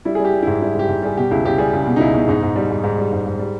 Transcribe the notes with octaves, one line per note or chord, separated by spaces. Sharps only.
G3 E4
G#4
G3
G4
G3
G#2 E4
G3 E4
G#2 G4
G#2
G3 G#4
B2 G4
C#2 E4
C#2 G4
G3 G#4
C#2
B2
D#4
C#2 E4
B2
G#2 D#4
G#2
G3
G#2
G#2
G3
G#2
G#2
G3